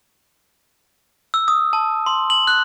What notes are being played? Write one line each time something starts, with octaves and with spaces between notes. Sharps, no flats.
E6
D#6
A5
C6
F#7
F#6